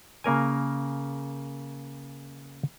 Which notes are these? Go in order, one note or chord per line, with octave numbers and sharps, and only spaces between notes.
C#3 A#3 A#4 G#5